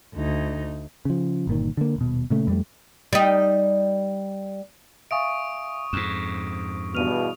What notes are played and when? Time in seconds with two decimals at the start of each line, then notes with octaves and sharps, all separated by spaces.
0.15 D2 D#4
1.05 C#3 F3
1.47 G1 A#2 D#3
1.77 D3 A#3
1.96 D#1 B2
2.30 A#2 C#3 A3
2.47 F2 G3 A3
3.13 G3 D#4
5.11 E5 F5 G#5 C#6 D#6 D7
5.93 F2 G#2 E7
6.95 E2 G2 B2 F6 D#7 F7